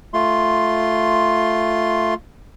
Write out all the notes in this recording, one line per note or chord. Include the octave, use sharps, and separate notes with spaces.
A3 F4 C6